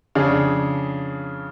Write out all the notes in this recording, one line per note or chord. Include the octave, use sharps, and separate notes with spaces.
F2 C#3 D4 G#4